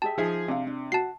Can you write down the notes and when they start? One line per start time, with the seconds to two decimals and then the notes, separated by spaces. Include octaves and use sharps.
0.02 G4 G#4 E5 A5
0.18 F3 D#4 G#4 E5 G#5
0.48 C3 D4 F5
0.67 D4
0.92 F#4 A5 C7